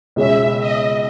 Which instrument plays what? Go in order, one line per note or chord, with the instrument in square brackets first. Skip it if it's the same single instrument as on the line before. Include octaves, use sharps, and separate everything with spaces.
[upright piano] C#2 B2 G#3 C#4 [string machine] E5
[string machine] D#5